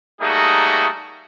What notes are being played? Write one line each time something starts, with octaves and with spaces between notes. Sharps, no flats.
G3 A3 A#3 D#4 F#4 G#4